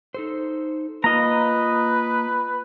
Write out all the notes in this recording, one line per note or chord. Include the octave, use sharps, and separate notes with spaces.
D#4 A4 C5
A#3 F4 B4 D#5 A#5